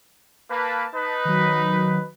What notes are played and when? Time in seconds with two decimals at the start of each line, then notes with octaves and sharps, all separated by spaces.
0.50 A#3 B4 A5
0.94 D#4 B4
1.25 D#3 F#3